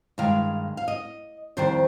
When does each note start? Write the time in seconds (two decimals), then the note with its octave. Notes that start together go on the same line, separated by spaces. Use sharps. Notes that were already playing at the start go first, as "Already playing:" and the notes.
0.18 G2 D#3 G#3 F5
0.77 F5
0.88 D#5
1.57 F2 D#3 G3 C5